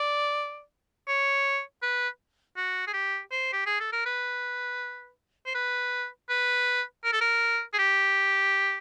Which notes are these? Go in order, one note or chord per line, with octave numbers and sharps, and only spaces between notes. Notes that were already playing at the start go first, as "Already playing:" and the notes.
Already playing: D5
C#5
B4
F#4
G#4
G4
C5
G4
G#4
A4
A#4
B4
C5
B4
B4
A#4
A4
A#4
G#4
G4